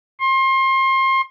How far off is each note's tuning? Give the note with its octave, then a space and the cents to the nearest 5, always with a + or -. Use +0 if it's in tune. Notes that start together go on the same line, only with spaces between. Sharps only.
C6 +30